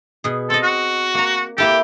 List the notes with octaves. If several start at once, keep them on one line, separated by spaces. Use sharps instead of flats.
B2 G#4
C4 A4 D#5
F#4
A#3 A#5
A#3 E4 G4 A4